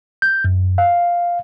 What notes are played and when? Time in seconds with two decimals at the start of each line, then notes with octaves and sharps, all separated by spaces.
0.22 G6
0.45 F#2
0.78 F5